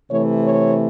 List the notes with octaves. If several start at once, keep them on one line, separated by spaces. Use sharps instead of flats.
C3 E3 A3 C#5
C#5